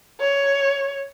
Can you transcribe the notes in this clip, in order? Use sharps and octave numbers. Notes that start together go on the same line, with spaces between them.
C#5